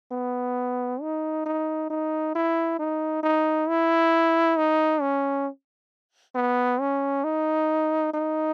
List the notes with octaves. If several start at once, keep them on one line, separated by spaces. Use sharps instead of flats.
B3
D#4
D#4
D#4
E4
D#4
D#4
E4
D#4
C#4
B3
C#4
D#4
D#4